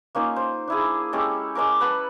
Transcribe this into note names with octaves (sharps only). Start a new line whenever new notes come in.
A#3 C#4 D#4 F4
C5
D4 E4 G#4
G#3 C#4 G4 A4
G#3 C#4 A#4 D6
B4 F#5 A5 B5